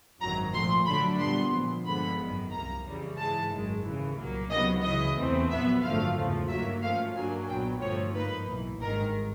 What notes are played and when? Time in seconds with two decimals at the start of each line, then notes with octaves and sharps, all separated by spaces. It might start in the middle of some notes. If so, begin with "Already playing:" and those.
0.21 G#1 F#2 D#3 F#3 A#5
0.54 A#2 F3 A3 C6
0.87 F#2 D3 F#3 A3 D4 B5
1.20 A#2 G3 B3 C6
1.53 A#1 A#2 F3
1.87 G2 D3 F3 G#3 B3 B5
2.19 G#1 F#2 D#3
2.52 C2 C3 F3 A#3 A#5
2.85 F2 C#3 E3 G3
3.18 G#2 E3 G#3 A5
3.51 G#1 F#2 D#3 G#3
3.84 D#2 C#3 E3
4.17 C2 A#2 F#3 A#3
4.51 C#2 C3 D#3 F#3 B3 D#5
4.84 C#2 C#3 E3 D#5
5.17 E2 C3 E3 A3 C4
5.50 A#1 A#2 F#3 B3 E5
5.83 G#1 F#2 D3 F3 A3 F5
6.16 E2 C#3 F3
6.49 G2 D#3 F#3 A#3 E5
6.82 G#2 F3 A3 C#4 F5
7.15 G2 D#3 F#3 A#3 D4 G#5
7.49 B1 A#2 F#3 B3 G5
7.81 G1 G2 D3 F3 A3 C#5
8.14 G#2 F3 A#3 D#4 B4
8.48 B1 A2 E3
8.81 G#1 G2 D#3 G#3 A#4